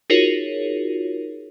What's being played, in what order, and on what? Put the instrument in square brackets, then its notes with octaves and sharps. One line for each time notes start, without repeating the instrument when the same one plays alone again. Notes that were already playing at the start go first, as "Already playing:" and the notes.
[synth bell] D#4 F4 F#4 G#4 A#4 C#5